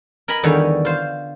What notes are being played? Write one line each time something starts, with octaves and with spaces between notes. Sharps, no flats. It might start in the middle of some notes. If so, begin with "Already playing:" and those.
A#4 D#5 G#5 A#5 B5
E2 D3 D#3 G3 C#5
F4 C5